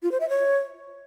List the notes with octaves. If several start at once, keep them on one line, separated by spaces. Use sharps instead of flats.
F4
C5
E5
C#5